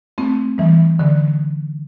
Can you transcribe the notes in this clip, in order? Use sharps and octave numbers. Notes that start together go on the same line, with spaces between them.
A3 C4
E3 G3
D3